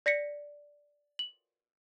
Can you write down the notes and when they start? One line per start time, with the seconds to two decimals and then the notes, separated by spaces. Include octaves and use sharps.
0.06 D5 A#6 B6 C#7
1.19 F#7